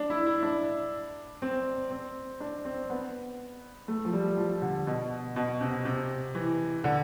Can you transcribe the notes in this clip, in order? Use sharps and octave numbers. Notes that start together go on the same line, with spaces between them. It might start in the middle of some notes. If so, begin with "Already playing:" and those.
Already playing: D4
E4
E4
D4
C4
C4
D4
C4
B3
A3
F3
G3
F3
D3
B2
B2
C3
C3
E3
D3